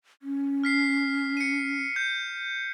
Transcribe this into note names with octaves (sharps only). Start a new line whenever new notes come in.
C#4
F6 B6 C7
C#7 D#7
G6